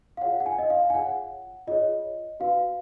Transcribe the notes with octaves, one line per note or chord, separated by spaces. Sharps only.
F5
F4 G#4 C#5 F#5
F#5
G#5
D#5
F5
G#5
F4 G#4 C#5 F#5
F4 G#4 C#5 D#5
F#4 B4 F5